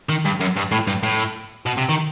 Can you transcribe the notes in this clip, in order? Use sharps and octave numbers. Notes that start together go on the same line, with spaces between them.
D#3
G2
F#2
G2
A2
G2
A2
B2
C3
D#3